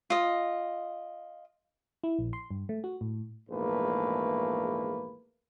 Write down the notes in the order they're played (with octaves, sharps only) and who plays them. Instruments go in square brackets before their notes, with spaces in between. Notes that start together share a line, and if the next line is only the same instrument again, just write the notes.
[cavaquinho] F4 D#5
[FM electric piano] E4
A#1
C6
G2
A3
F#4
A2
[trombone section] A#1 E2 G#2 A3 A#3 B4